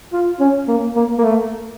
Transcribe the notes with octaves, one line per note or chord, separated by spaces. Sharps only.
F4
C#4
A#3
A#3
A#3
A3